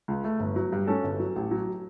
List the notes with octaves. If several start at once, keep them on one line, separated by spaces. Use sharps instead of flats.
C#2
A3
G1
F#3
G2
C#4 A4
G1
F#3
A1
F#3